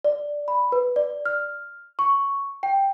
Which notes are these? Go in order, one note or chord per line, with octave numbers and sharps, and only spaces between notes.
D5
B5
B4
D5
F6
C#6
G5